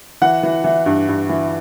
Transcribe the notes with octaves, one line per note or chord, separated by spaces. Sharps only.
E3 F#5
E3
E3
G2
G2
E3